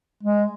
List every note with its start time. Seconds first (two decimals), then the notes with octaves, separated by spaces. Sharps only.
0.23 G#3